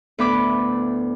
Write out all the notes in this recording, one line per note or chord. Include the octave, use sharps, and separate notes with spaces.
D2 A2 B3 B5 D6